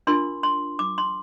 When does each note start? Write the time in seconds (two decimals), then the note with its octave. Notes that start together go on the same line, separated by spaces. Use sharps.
0.07 D4 F4 A#4 C6
0.43 C6
0.79 D6
0.98 C6